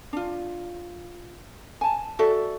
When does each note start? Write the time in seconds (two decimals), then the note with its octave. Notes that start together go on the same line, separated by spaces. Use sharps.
0.13 D4 F4
1.81 G#5 A5
2.19 F#4 A4 D5 E5